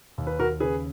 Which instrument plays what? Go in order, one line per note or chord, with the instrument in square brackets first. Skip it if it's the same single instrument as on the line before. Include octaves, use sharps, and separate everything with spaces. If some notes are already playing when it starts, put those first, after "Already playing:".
[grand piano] D#2
B4
D#2 F#4 A#4
C#3 G#4 B4